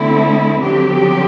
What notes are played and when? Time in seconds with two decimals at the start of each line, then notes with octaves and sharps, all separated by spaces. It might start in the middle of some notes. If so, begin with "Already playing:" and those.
Already playing: D3 A3 C4 E4
0.59 D3 F#3 C4 G4